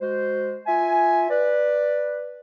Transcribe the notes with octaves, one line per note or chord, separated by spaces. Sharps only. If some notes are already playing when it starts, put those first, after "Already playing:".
G#3 F#4 C5
F4 E5 G#5
B4 D5